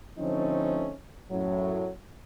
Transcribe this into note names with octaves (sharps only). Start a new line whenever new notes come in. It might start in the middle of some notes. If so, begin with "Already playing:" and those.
D3 F3 A3 C4 C#4 D#4
F#2 A2 F#3